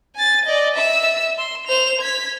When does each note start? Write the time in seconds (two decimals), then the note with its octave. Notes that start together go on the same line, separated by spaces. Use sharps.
0.15 G#5 A6
0.45 D5 D#5
0.76 E5 E6
1.38 C6
1.67 C5 F7
2.01 G#6 B6